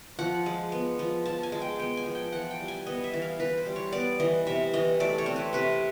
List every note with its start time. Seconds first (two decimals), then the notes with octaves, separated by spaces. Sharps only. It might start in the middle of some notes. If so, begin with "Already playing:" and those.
0.19 F3 F#5
0.46 G#3
0.72 B3
0.99 F3
1.26 F3 A5
1.43 G#5
1.52 G#3
1.62 G5
1.79 B3 G5
1.97 G#5
2.06 F3
2.15 G5
2.33 E3 F#5
2.51 G5
2.60 G3
2.68 G#5
2.87 B3 D#5
3.04 E5
3.13 E3
3.22 F5
3.40 E3 B4
3.58 C5
3.66 G3
3.76 C#5
3.93 B3 D5
4.20 E3 D#5
4.47 C3 E5
4.74 E3 D#5
5.00 A3 D5
5.18 C#5
5.26 C4
5.36 B4
5.53 C3 B4